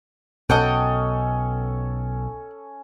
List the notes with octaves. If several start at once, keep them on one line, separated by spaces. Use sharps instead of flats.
B1 B2 C#4 A4 D#5 F#5 G5